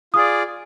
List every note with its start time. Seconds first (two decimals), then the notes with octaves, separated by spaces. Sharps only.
0.14 F4 G#4 D5 D#6